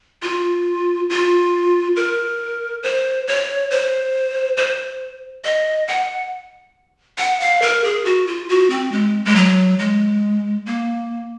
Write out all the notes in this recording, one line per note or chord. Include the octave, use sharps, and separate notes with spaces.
F4
F4
A#4
C5
C#5
C5
C5
D#5
F#5
F#5
F5
A#4
G#4
F#4
F4
F#4
C4
G#3
G#3
F#3
G#3
A#3